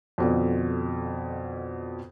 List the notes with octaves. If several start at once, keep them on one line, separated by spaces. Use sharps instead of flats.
F2 B2 D3